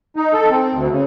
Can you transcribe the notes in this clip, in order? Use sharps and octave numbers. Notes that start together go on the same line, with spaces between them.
D#4
A4
C4
D2
C#3